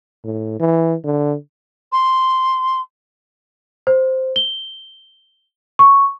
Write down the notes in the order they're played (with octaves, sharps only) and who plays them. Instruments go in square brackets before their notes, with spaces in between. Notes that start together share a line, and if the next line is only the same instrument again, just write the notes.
[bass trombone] A2
E3
D3
[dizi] C6
[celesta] C5
G7
C#6